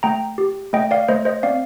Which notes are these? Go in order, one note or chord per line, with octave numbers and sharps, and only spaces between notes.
A3 G5 A#5
G4
A3 D#5 G5
D5 F5
A3 C5 D#5
C5 D#5
C4 D5 F5